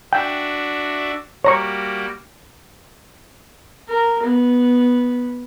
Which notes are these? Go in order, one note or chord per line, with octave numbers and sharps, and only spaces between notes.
D4 F#4 E5 G5
G3 A#3 F#4 C#5 A#5 C#6
A#4
B3